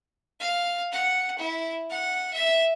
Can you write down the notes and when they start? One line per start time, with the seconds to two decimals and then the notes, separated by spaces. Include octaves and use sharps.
0.40 F5
0.92 F#5
1.38 E4
1.90 F#5
2.33 E5